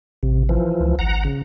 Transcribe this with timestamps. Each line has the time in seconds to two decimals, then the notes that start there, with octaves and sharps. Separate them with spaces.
0.23 A1 C3
0.49 E3 F3
0.80 C#2
0.99 G#1 F#5 A#5
1.25 C#3